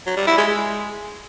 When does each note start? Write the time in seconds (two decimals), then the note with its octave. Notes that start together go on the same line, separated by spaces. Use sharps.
0.06 F#3
0.17 G3
0.27 E4
0.37 G#3
0.48 G#3